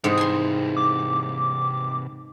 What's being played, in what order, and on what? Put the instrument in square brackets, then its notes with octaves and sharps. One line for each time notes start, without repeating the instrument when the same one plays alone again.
[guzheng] G#2 [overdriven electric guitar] C3 E3
[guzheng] G#5 C6
[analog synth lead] D6